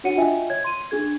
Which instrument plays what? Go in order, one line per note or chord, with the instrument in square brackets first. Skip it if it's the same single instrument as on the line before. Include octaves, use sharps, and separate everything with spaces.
[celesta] D4 F#4 C#5 F#5 C#7 D#7
F4 D#5 E5 G5 G#5
C#5 G#6
C6 D#7
D4 G#4 G#6